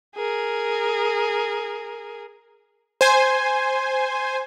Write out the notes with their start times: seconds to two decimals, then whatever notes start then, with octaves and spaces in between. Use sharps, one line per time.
0.16 G#4 A#4
3.01 C5 G#5